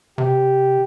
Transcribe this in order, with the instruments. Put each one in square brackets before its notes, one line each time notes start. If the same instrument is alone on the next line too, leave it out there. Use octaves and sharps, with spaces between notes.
[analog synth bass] C3 [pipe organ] G4